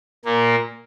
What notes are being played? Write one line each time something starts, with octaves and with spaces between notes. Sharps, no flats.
A#2 A#3